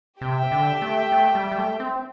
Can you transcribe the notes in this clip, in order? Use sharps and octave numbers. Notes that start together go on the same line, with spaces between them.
C3 G4 E5 G5
D3
A3
A3
G3
G3
A3
C4